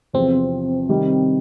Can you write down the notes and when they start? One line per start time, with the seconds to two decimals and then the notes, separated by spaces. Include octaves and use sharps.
0.13 E2 C3 F3 C4
0.89 C3 D#3 G3